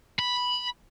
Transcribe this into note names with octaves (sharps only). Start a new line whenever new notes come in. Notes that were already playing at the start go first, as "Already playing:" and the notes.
B5